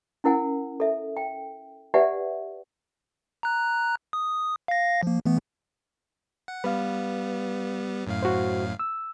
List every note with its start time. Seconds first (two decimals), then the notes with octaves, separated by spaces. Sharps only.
0.24 C#4 E4 A#4 F#5 G#5
0.80 A4 E5
1.17 G5
1.94 G4 B4 D5 E5 F#5 G#5
3.43 A#5 F#6
4.13 D#6
4.68 F5 A#6
5.03 F3 A#3
5.25 E3 A3 B3
6.48 F#5
6.64 G3 B3 B4 F5
8.07 F#2 A2 F5
8.22 F#4 C5
8.79 E6